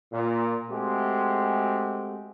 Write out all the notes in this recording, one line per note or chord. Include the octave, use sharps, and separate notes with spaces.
A#2
G#3 A3 C4 F#4 G4